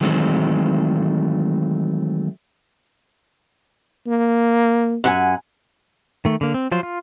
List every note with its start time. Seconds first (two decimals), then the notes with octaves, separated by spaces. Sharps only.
0.01 D#3 E3 F#3 G#3 A3 C4
4.06 A#3
5.04 F#2 F#5 G#5
6.25 D#3 A3
6.41 D3 A#3
6.54 C4
6.71 F3 F#3 F4 C5
6.83 F4